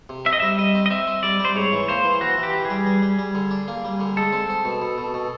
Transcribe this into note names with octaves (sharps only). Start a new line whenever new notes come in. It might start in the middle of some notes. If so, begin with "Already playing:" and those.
C3
C4 E5
D#5
G3 E5
G3 D#5
C4
D#5
C4 E5
C4
G3 D5
G3 C5
G#2 C#5
E3
A#3 C5
E3
E3 F#4
E3
G4
E3
G#4
G3
G3
G3
G3
D3
D4
A#3
G3
D3
G#3 A4
C4
C4
B2
B2
B2
B2